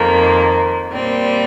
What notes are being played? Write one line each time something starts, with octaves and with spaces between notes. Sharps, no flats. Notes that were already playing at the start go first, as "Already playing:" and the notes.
Already playing: F2 D#3 A#3
A#2 G3 C4